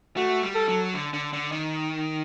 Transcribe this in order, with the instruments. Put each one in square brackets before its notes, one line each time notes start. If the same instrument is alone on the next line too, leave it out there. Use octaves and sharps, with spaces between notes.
[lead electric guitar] A3 [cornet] F#4
[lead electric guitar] G3
[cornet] A4
[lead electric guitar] F#3
D3
D3
D3
D#3